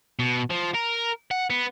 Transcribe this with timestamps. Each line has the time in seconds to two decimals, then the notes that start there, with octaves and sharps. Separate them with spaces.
0.19 B2
0.50 F3
0.74 A#4
1.31 F#5
1.50 B3